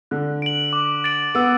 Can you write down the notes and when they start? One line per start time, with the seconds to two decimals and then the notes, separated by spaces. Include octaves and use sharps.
0.11 D3 F#6
0.42 D7 F#7
0.73 D6
1.04 A6 D7 F#7
1.35 B3 E6